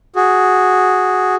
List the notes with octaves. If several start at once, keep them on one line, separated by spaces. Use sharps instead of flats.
F#4 G#4